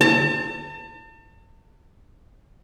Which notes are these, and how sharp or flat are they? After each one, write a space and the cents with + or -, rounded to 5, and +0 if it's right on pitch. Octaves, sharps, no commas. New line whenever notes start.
A5 +40